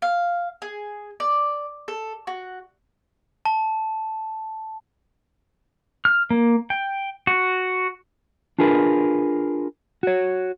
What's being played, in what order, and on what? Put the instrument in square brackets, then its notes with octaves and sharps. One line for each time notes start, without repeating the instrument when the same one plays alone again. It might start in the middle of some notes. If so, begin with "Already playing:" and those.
[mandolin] F5
G#4
D5
A4
F#4
[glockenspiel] A5
[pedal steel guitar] F6
A#3
G5
F#4
[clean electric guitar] D4 F4 G#4 A#4 B4
F#4 C#5